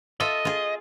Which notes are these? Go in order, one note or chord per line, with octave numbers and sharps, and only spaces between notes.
F4 A4 D#5 E5
F4 G#4